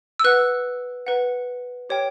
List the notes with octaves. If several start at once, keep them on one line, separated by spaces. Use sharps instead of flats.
E6
B4 F#5 F#6
B4 F#5
G4 C#5 G5